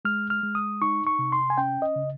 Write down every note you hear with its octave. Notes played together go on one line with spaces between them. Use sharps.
G#3 F6
F6
G#3
D#6
D#4 C#6
C#6
C3
C6
G#5
C#4 G5
D#5
C#3